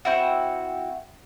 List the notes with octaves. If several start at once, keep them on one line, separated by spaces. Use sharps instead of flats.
C4 E4 F#4